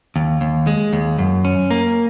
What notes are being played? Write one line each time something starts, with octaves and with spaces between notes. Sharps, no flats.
D#2
D#2
G#3
D#2
F#2
C#4
A#3